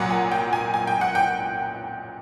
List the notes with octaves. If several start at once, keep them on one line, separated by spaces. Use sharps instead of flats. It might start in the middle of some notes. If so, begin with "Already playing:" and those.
Already playing: C2 A#2 F#3 F#5
G#5
G5
G#5
G#5
G5
F#5
G5